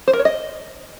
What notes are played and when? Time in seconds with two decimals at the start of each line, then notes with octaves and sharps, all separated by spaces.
0.08 C5
0.13 A#4
0.19 C#5
0.25 D#5